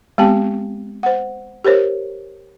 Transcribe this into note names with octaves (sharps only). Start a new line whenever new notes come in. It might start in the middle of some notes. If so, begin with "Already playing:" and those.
G#3 B3 C4 G4 G5 A5
C5 F#5
G4 A#4 C5 C#5